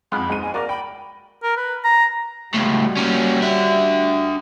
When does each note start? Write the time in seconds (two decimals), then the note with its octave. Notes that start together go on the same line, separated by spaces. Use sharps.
0.12 F2 G#3 B3 B4 F5 B5
0.30 G1 G#2 G#3 D#7
0.42 G#5
0.54 A#3 F#4 A#4 D5
0.69 G5 B5
1.43 A#4
1.57 B4
1.84 A#5
2.55 C#2 A2 G3 F#4
2.97 A#3 C#4
3.42 D4 E5